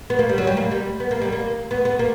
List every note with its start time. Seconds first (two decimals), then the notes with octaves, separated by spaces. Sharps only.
0.10 B3
0.19 A#3
0.29 G3
0.38 F#3
0.47 G3
0.57 A#3
0.71 G3
1.00 B3
1.11 A#3
1.22 G3
1.32 A#3
1.71 B3
1.85 B3
1.99 A#3